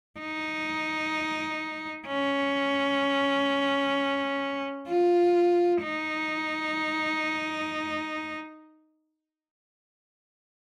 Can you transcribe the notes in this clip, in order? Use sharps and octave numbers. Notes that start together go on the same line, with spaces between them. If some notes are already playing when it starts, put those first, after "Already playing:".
D#4
C#4
F4
D#4